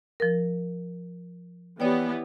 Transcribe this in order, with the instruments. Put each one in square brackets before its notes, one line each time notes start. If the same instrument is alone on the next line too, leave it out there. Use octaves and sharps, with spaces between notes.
[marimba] F3 A#4
[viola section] E3 B3 G4 [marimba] C#5 D5 G5